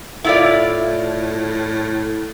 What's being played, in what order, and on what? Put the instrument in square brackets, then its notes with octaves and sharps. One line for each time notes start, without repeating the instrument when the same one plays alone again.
[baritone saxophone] A2 [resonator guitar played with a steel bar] E4 F4 D5